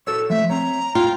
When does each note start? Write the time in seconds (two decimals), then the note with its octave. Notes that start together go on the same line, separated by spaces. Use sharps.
0.07 F#4 A4 C#5 E6
0.30 F3 A3 E5
0.50 C4 C#5 A#5
0.95 F4 G5